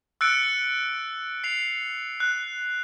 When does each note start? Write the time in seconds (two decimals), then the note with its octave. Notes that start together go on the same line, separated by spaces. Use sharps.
0.21 E6 F#6 A6 C#7 D7
1.44 C7 F7
2.20 F#6